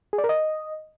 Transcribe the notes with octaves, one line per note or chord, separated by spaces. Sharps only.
G#4
D5
A#4
D#5